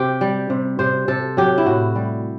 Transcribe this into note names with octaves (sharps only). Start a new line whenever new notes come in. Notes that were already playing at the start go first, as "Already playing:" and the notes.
Already playing: C3 G4
G3
C3
C3 C5
C3 A4
F#3 G4
E4
A2 F#4
G3